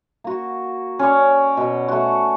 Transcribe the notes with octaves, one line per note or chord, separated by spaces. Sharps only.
A#3 F#4
C#4 C#5 D5
B2
A3 F#4